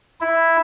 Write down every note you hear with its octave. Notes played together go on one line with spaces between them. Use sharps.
E4